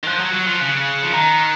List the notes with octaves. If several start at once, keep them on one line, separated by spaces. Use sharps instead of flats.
D#3
F3 F#6
F#3
F#3 C#7 F#7
F3
C#3 F#6
C#7 F#7
F3
D#3 A#5
D#6 F#6 C#7